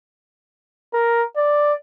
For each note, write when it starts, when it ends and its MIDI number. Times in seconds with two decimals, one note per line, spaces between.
0.94 1.23 70
1.37 1.74 74